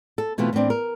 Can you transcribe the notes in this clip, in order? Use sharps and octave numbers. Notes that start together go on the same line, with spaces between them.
A4
B2 E3 A3 C4 F4
A2 E3 B3 C4 D4
A#4